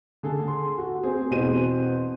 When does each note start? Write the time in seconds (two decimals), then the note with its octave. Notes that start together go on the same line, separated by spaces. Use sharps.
0.23 D3 G#4 A4
0.48 C6
0.78 F#4
1.03 C4 G#4
1.31 E2 B2 C4 D#7